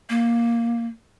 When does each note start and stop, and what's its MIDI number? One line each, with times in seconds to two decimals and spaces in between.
0.10 0.86 58